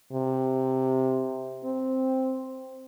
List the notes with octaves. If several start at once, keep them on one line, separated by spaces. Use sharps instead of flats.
C3
C4